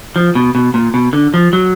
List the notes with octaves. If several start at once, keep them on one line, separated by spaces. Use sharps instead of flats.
F3
B2
B2
A#2
B2
D3
F3
F#3